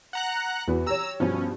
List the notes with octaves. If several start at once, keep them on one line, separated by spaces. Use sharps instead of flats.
F#5 A#5 F#6
E2 E3 B3 F#4
G4 C#5 A#5 E6
G2 B2 F3 C#4